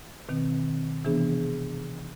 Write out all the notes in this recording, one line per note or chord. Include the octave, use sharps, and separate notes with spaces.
B2 D#3 C4
C3 E3 B3 D4 G#4